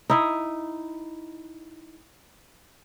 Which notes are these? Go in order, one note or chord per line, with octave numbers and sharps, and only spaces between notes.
D#4 E4 D#5